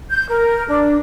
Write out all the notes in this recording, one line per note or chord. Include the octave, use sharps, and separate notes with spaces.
G6
A#4
D4